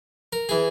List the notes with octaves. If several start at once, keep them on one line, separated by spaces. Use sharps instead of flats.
A#4
E3 G#4